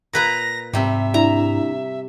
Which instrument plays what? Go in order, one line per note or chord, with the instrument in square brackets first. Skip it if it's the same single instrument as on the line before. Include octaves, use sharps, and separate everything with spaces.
[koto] A#2 B4 A#5 [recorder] A#6
[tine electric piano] G#2 [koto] C3 G3 [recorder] E5
[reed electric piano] D4 E4 [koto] A#5